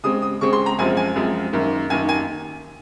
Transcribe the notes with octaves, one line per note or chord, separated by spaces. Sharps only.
C#3 G#3 C4 D#6
D#6
C#3 G#3 C4 C#6
C6
A#5
F#2 F3 G#3 C4 G#5
G#5
F#2 F3 G#3 C4
F#2 D#3 A#3
F#2 D#3 A#3 G#5
G#5